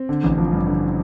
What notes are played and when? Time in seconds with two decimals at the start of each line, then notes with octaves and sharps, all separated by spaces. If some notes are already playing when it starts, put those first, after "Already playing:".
Already playing: C4
0.09 D3
0.24 A1
0.38 F3
0.53 G2
0.67 D3